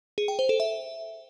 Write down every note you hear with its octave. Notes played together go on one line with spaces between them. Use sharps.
G#4
G5
C5
A4
E5